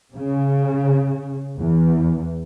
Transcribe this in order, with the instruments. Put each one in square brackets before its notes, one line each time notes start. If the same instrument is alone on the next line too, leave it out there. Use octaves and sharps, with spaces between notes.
[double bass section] C#3
E2